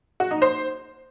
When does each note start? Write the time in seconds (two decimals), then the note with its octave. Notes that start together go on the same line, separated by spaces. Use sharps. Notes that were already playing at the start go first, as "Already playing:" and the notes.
0.20 F#4
0.31 D#4
0.42 C5